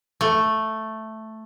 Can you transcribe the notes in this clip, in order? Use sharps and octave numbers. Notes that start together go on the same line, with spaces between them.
A3